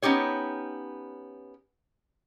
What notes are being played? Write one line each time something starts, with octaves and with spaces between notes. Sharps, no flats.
B3 C#4 D#4 G4 C#5